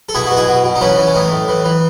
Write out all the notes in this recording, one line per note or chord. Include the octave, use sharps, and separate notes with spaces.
A4
B2 E4 G#4
B2 F#4
E4 G#4
B2
B2
D#4
E3 C#4 E4
E3
C#4
A2 D#4
A2
E3
E3